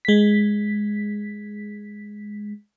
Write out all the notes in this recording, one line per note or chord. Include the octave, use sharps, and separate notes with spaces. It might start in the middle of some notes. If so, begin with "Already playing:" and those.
G#3 B6